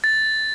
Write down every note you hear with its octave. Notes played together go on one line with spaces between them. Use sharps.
A6